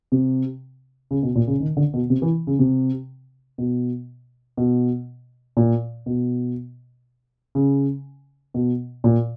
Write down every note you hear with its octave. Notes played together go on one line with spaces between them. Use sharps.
C3
C#3
B2
A#2
C#3
D#3
D3
B2
C3
E3
C#3
C3
B2
B2
A#2
B2
C#3
B2
A#2